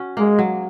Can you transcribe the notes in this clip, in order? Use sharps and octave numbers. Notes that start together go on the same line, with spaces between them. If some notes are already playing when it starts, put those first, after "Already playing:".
Already playing: C#4 F#4
G#3 A#3
F#3